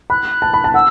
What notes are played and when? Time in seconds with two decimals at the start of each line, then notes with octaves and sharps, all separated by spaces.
0.10 B5 F#6
0.42 A5
0.54 B5
0.64 A5
0.74 F#5 E6